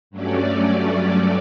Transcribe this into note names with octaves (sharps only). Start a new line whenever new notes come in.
G2 F#3 A3 C#4 D5